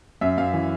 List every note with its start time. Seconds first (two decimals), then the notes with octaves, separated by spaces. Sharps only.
0.21 F#2 E5
0.37 F#2 F5
0.53 E3